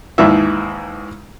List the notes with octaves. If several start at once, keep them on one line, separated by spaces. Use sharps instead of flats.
D#2 G#2 E3 E5